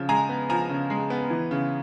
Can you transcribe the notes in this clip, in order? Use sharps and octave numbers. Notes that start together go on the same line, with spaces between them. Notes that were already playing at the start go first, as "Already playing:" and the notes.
Already playing: C#3 F3
G#3 G#5 A#5
B3
F3 G#5 A#5
C#3
G#3
B3
E3
C#3